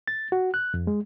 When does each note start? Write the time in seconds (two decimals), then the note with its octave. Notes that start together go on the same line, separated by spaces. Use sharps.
0.08 A6
0.32 F#4
0.54 F#6
0.74 F2
0.87 G#3